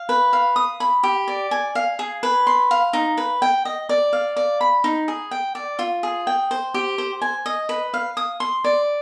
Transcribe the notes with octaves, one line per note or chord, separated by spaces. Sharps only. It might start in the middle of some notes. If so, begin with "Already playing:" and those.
Already playing: F5
B4
F5
D#6
B5
G4
D5
G#5
F5
G#4
B4
C6
F5
D#4
B4
G5
D#5
D5
F5
D5
B5
D#4
G#4
G5
D5
F4
G#4
G5
C5
G4
C5
G#5
D#5
B4
F5
D#6
C6
D5